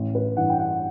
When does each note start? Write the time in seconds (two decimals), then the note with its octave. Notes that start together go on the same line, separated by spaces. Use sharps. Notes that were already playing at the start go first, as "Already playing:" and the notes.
Already playing: A1
0.15 B4
0.37 G2 E3 F#5
0.49 G5
0.58 F#5